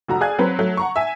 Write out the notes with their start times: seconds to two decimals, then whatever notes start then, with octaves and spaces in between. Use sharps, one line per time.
0.08 F1 F#4 A#5
0.21 G#4 D5 F5 G#5 F#6 G#6
0.39 F#3 C4 B4 A#5
0.59 F#3 A3
0.77 F#5 A#5 C#6
0.96 E5 G#5